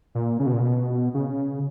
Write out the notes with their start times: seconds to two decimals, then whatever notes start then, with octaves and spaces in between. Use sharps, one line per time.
0.15 A#2
0.39 C#3
0.46 B2
0.53 A#2
0.60 B2
1.14 C#3